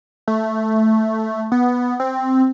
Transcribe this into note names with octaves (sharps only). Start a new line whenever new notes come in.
A3
B3
C4